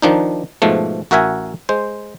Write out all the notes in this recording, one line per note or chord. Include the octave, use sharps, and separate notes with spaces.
D#3 F3 D4 D#4
G#2 B2 F3 A3
A1 F#4 A#4 E5 F#5 G#5
G#3 C5